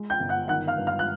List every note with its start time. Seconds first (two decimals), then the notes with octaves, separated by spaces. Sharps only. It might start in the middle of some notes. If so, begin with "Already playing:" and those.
Already playing: G#3
0.10 G5 G6
0.20 G1
0.29 F#5 F#6
0.48 D#3 F#5 F#6
0.67 F5 F6
0.78 G2
0.87 F5 F6
0.99 F#6